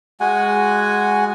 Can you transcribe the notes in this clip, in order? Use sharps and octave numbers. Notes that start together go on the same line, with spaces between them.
G#3 F#4 F#5 G#5